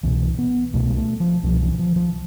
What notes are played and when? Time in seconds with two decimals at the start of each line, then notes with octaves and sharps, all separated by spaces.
0.03 C2 B2 E3
0.39 B3
0.73 C2 B2 A3
0.90 G3
0.97 A3
1.20 F3
1.43 C2 B2 F3
1.62 E3
1.79 F3
1.96 F3